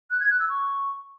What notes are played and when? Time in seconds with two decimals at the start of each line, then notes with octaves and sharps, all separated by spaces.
0.11 F#6
0.20 G#6
0.30 F#6
0.39 E6
0.49 C#6